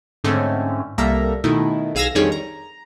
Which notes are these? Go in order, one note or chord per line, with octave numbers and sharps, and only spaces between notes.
G#2 D3 A3 C4 C#4
C2 G3 A#3 A4 E5 A#5
B2 D#3 A3 E4
B1 G#4 F5 E6 G#6 A#6
F2 D3 D#3 G3 G#4 C#5
A#5